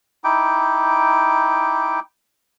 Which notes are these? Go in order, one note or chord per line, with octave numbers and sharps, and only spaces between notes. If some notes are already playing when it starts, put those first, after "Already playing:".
D#4 E4 G5 D6